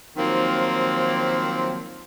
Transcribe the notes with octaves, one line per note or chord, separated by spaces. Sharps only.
D#3 F3 F#3 A#3 C4